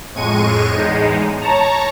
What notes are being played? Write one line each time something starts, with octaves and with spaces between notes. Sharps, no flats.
F2 A2 G#3 C#6 D#7
E2 A2 G#3 D#4
C#5 A5 A#5